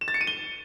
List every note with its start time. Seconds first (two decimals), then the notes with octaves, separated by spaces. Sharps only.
0.01 E7
0.08 A6
0.14 C#7
0.21 D#7
0.27 G7